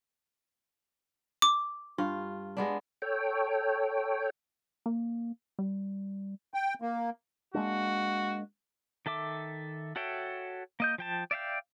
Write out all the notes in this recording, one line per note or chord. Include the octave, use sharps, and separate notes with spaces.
D6
G2 F4
G#3 B3 D4
A4 C#5 G5
A#3
G3
G5
A#3
G#3 A#3 D4 F#4
D#3 A4 E5 D6
F#4 A4 C#5 E5 G5
A#3 D#5 G6
F3 G5 A5
D5 E5 F5 G5